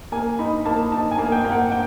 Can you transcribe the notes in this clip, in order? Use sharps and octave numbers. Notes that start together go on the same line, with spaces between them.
A#3 G#5
D#4 B5
A#3 A5
D#4 A5
G#5
A#3
G5
A#3
F#5
G5